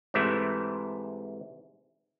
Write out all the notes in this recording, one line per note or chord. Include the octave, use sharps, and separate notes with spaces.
G#2 C3 E3 A3 E4